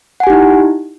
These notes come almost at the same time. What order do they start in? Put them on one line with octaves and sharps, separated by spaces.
F#5 G#5 G4 D#4 E4